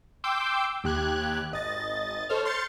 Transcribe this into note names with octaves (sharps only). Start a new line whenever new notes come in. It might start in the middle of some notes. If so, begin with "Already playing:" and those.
G5 C6 D6 E6 G6
D#2 G4 F#6 G#6
G#1 D#5 A6
A4 C5 C#5 F6
C6 F6 G6 A6 C#7